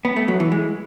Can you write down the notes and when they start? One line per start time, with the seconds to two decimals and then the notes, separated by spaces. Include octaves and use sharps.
0.05 B3
0.16 A3
0.28 F#3
0.40 E3
0.52 G#3